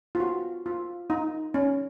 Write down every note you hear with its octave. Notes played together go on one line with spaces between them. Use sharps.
F4
F#4
F4
D#4
C#4